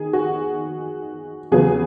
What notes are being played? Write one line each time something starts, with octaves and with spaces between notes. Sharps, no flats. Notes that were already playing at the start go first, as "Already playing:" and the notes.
Already playing: D#3 G#4
F#4
E2 C#3 F#3 B3 G#4